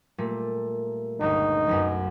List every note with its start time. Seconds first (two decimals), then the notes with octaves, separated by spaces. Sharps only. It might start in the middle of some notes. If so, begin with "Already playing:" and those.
0.18 A#2 G3 A3
1.21 G1 C#2 D#4
1.67 F#1 B1 F#2